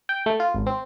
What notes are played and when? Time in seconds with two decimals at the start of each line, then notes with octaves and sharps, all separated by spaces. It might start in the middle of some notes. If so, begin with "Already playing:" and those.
0.09 G5
0.26 A3
0.40 F4
0.54 G#1
0.66 C4